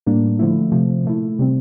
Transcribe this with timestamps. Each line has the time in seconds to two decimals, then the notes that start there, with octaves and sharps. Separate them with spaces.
0.06 A2 G3 A#3 D4
0.39 D3 F3 A3 E4
0.72 C3 F3 A3
1.04 A#2 A3 E4
1.39 C3 G3 C4